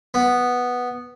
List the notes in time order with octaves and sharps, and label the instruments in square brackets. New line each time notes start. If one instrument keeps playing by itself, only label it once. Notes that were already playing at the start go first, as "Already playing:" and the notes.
[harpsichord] B3